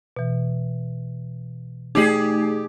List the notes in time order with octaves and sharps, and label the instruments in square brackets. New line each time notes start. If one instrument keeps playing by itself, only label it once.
[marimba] B2 E3
[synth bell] A3 D#4 [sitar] G4 G#4